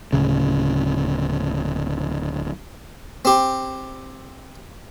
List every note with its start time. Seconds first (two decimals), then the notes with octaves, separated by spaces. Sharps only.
0.13 D1 C#3
3.25 C4 G4